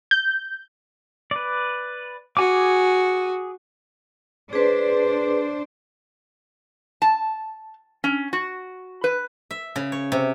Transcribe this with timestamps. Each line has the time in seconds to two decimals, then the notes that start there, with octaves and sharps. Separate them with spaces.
0.11 G6
1.31 B4 D5
2.37 F#4 G#4 G#5 D6
4.53 D4 G#4 B4 C5 D5
7.02 A5
8.04 C#4
8.33 F#4
9.04 B4
9.51 E5
9.76 C#3
9.92 C#5
10.12 C3